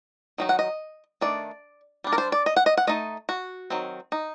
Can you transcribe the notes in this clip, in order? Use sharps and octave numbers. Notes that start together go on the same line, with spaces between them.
D#3 F#3 D#4
F#5
D#5
D#3 A3 D4 D5
G3 D4
A#4
C5
D5
D#5
F#5
D#5
F#5
A3 D#4 D#5
F#4
D#3 F#3 C4
D#4